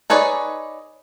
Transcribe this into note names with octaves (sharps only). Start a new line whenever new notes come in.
D#4 G#4 B4 C#5 D5